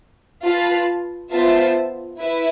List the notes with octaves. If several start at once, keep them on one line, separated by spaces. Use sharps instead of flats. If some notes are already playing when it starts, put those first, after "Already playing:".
F4 B4 F5 A5
B3 F4 C5 E5 A5
E4 B4 E5